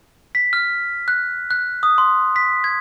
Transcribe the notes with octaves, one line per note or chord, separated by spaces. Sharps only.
B6
F6
F#6
F#6
D#6
C6
B6
G#6